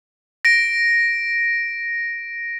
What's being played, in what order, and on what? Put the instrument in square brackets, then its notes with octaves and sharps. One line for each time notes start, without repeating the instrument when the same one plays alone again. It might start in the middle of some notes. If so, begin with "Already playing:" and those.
[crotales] A#6 D7